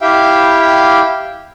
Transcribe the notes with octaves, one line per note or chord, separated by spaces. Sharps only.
E4 G4 E5 F5 G5